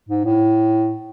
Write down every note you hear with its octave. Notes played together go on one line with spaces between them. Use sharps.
G#2
A2